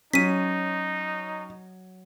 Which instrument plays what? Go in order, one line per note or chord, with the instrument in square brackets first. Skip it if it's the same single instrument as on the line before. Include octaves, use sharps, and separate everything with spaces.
[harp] F#3 [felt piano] C#4 [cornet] D#4 [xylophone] B6 D#7